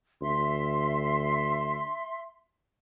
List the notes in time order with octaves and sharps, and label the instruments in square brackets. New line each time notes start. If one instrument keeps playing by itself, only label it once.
[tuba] D2 [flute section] E5 C6